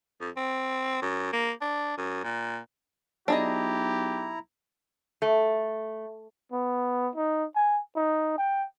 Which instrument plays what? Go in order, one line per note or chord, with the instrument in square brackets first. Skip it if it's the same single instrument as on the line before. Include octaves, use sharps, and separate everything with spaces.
[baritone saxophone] F2
C4
F#2
A#3
D4
F#2
A#2
[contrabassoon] B1 [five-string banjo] D4 G#4 D#5 [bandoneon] E4 A#5 [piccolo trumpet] G4
[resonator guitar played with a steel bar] A3
[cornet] B3
D#4
G#5
D#4
G5